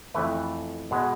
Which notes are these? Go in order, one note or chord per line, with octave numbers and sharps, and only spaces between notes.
F2 E3 A3 B4
B2 G#3 B3